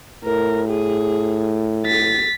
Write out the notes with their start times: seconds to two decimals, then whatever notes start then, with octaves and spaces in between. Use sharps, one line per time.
0.24 A2 A#4
0.69 G#4
1.86 A6 B6